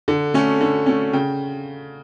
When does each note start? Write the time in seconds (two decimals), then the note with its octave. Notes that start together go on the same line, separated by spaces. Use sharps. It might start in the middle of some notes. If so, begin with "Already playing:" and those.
0.08 D3
0.34 A3 C#4
0.61 D3
0.86 A3 C#4
1.13 C#3 G5